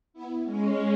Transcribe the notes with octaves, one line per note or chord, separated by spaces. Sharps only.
B3 E4
G#3 C#4